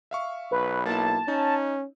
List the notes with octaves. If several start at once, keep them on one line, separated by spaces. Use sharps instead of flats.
E5 F5 C#6
B1 B4
A#3 E4 A5
C#4 D#4